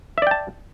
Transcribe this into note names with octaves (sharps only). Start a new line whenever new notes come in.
D5 E5 G5 A5